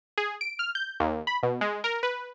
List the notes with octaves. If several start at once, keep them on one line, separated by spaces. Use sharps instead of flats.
G#4
D7
F6
G6
D#2
B5
B2
G#3
A#4
B4